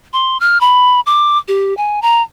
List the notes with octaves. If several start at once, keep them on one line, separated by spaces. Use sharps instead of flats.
C6
F6
B5
D6
G4
G#5
A#5